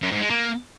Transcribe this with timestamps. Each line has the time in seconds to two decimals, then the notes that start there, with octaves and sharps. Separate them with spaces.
0.02 F#2
0.12 G#2
0.21 G#3
0.30 A#3